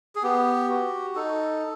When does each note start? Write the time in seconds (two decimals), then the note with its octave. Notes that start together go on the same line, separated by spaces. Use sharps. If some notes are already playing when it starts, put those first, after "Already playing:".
0.15 G#4
0.23 B3 G4
0.70 F#4
1.16 D#4 A4